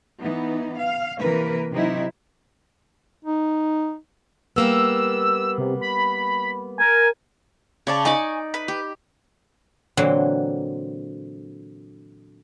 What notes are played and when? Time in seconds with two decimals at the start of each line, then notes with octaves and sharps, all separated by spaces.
0.23 E3 B3 D#4
0.78 F5
1.21 C3 E3 A#3 A#4 B4
1.72 C3 F#3 D#4 E4
3.25 D#4
4.56 G3 A#3 B3 E6
5.58 C3
5.81 B5
6.79 A#4 G#5
7.87 C#3 C#5 D5 A5
8.05 D#4 D5 G#5 C#6 D6
8.54 B4
8.68 G4
9.97 A#2 D3 E3 F#3 C4